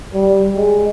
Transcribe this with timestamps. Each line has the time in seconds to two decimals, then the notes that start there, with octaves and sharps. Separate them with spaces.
0.14 G3
0.57 G#3